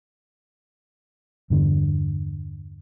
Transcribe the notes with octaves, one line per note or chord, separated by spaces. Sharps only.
E2 G2 D3